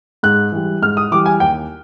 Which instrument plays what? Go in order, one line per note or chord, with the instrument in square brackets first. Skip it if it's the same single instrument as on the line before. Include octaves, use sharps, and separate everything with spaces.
[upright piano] G#2 F#6
E3 G3
G#2 F6
D#6
E3 G3 D6
G#5
D#2 G5